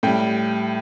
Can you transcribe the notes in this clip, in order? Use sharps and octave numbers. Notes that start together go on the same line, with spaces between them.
A2 G3 G5